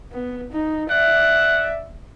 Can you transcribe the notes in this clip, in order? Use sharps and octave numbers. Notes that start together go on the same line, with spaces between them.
B3
D#4
D5 E5 F#5